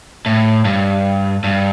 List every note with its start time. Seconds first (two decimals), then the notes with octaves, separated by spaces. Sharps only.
0.26 A2
0.65 G2
1.44 G2